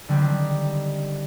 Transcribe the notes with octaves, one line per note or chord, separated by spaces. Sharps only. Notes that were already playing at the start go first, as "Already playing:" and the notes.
D3 D#3 G3 C4